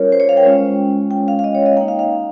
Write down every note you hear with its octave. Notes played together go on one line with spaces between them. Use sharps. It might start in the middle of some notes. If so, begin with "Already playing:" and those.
Already playing: G3 C#4 F4 A#4 C#5
C5
C#5
F5
G5
G#3 C#4 F4
G5
F5
F5
D#5
C#5
D#5
A#3 D#4 G5
F5
F5